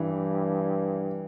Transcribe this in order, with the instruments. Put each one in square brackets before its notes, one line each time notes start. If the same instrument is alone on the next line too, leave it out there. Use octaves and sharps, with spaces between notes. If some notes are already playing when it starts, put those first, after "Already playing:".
Already playing: [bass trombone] G2 [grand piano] E3